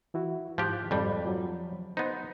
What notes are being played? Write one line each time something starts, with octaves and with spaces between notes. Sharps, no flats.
E3 E4 F#4
G#2 F3 G4 F#6
F2 G#2 G3 D5 B5
F3 F#3
B3 D#4 C5